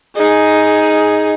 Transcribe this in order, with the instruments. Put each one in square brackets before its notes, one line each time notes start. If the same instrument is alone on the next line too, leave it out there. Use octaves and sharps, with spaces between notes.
[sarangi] D#4 [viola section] G#4